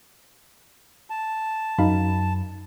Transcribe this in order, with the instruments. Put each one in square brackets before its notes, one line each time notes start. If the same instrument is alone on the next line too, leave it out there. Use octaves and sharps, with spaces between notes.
[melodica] A5
[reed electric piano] F#2 [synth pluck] D#4 F5 B5